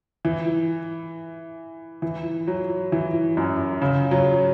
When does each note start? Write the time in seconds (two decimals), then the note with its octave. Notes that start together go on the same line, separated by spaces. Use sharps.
0.25 E3
2.02 E3
2.47 F#3
2.92 E3
3.37 F#2
3.82 C#3
4.11 F#3